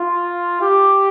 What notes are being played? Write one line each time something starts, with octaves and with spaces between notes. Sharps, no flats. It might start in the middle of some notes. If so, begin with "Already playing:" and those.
Already playing: F4
G4